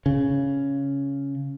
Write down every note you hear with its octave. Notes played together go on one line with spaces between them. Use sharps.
C#3